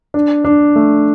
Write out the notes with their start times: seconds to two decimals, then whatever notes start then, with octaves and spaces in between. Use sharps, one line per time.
0.14 D4
0.45 D4
0.75 A3